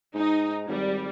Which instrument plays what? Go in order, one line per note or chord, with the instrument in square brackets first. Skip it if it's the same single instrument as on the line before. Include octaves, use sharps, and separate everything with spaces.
[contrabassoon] G#2 [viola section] D#4
[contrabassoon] G#1 [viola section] G3